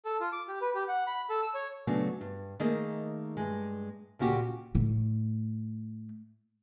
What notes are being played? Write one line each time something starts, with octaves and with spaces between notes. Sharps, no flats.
A4
F4
D6
G4
B4
G4
F#5
B5
A4
E6
C#5
C#3 F#3 A3 B3 D4
G2
D#3 A3 A#3 G#4 D#5
G2 G#3
D2 A#2 C#3 F#4 G4
A2 A3